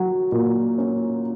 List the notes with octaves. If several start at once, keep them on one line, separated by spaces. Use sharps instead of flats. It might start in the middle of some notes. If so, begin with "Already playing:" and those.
Already playing: F#3
A#2
C#4